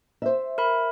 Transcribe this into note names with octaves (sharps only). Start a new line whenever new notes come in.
C5 E5
A#4 B5